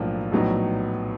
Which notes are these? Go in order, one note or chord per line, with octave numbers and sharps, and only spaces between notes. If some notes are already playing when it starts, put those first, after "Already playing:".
Already playing: B1 A2 F3 A#3 D4
A#1 A2 F#3 B3 D#4